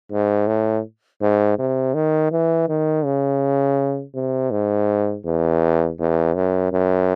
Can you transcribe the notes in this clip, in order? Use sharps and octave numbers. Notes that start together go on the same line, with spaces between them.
G#2
A2
G#2
C3
D#3
E3
D#3
C#3
C3
G#2
E2
E2
F#2
F#2